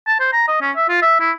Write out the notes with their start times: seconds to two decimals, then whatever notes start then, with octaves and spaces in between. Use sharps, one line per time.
0.07 A5
0.20 C5
0.33 A#5
0.48 D#5
0.61 C#4
0.76 E5
0.89 F4
1.02 E5
1.20 E4